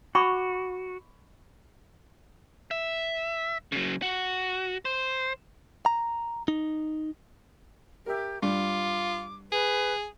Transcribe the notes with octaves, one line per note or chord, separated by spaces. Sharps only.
F#4 B5 C#6 D6
E5
C#3 F#3
F#4
C5
A#5
D#4
G4 A#4 E5
G2 F4 D6
G#4 B4